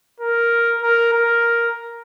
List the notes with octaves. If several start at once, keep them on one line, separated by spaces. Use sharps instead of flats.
A#4
A#4
A#4